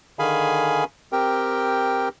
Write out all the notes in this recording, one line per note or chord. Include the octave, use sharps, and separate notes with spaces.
D3 D#3 G#4 F5 G#5 B5
C4 G4 A#4 G5